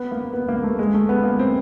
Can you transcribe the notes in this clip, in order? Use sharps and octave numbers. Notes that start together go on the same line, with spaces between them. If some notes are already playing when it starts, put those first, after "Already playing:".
Already playing: B3
A#3
B3
A#3
A3
G#3
A3
B3
A#3
C4